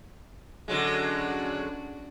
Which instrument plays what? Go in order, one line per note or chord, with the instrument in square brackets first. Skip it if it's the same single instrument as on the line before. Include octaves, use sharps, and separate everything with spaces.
[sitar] D3 F#3 G#3 [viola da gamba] C#4 D4 F#4